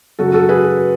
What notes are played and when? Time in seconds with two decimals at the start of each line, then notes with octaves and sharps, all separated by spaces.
0.19 F#2 C#3 F#3 F#4 A4
0.33 F#4 A4
0.49 G#4 B4